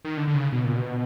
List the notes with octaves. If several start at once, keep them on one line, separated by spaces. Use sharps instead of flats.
D#3
D3
D3
C#3
B2
A#2
B2